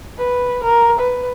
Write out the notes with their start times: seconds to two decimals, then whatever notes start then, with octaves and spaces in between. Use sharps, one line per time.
0.18 B4
0.64 A#4
0.99 B4